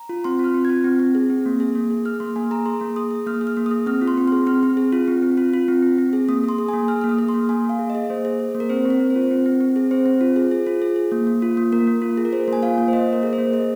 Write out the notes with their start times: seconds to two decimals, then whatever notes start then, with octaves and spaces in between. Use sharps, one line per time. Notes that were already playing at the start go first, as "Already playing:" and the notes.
Already playing: A#5
0.09 F4
0.24 C4 C6
0.39 F4 F6
0.54 C4
0.65 F4 G#6
0.84 C4
1.00 C4
1.15 G#4
1.30 C4
1.46 A#3
1.60 G#4
1.75 A#3
1.91 G#4
2.05 G#4 F6
2.20 A#3 C6
2.36 A#3 G#5
2.51 G#4 A#5
2.66 G#4 C6
2.81 A#3
2.96 G#4 D#6
3.11 G#4
3.27 A#3 F6
3.41 G#4
3.47 F6
3.57 A#3
3.66 D#6
3.71 G#4
3.86 C4 F6
4.01 F4
4.08 C6
4.17 C4
4.28 G#4 C6
4.47 C4 F6
4.63 C4
4.77 G#4
4.93 F4
5.08 C4
5.23 C4
5.37 F4
5.53 F4
5.68 C4
5.83 C4
5.98 C4
6.13 G#4
6.28 A#3 D#6
6.44 G#4 C6
6.58 G#4
6.68 G#5
6.74 A#3
6.88 G#4 F6
7.01 A#3 F6
7.09 D#6
7.19 G#4
7.29 C6
7.34 A#3
7.49 A#3 G#5
7.65 A#3 F5
7.79 G#4
7.90 D#5
7.95 G#4
8.10 A#3 C5
8.25 G#4
8.40 G#4
8.55 A#3
8.60 A#4
8.69 C4 C5
8.85 C4 A#4
9.00 C4
9.10 C5
9.15 F4
9.31 C4
9.46 C4
9.61 C4
9.76 G#4
9.91 C4 C5
10.06 C4
10.21 F4
10.36 G#4
10.51 G#4
10.67 F4
10.82 G#4
10.96 G#4
11.12 A#3
11.27 A#3
11.42 F4
11.57 A#3
11.72 A#3 A#4
11.87 A#3
12.02 F4
12.17 G#4
12.25 A#4
12.33 G#4 C5
12.48 A#3 G#5
12.63 F4 F5
12.78 A#3
12.88 C5
12.93 A#3 D#5
13.09 A#3 A#4
13.23 G#4 A#4
13.33 C5
13.38 A#3
13.53 G#4 D#5